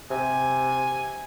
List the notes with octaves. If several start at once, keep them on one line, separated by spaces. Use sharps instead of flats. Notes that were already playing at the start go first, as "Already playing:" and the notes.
C3 G#5